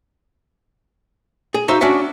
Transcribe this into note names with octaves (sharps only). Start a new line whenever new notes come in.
G#4
D#4 F#4 C5 E5 F5
C#4 D4 F#4 D5 E5 F#5